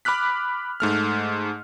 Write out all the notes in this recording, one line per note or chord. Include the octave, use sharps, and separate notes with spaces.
B5 D6 F6 F#6 B6
G#2 A3 F6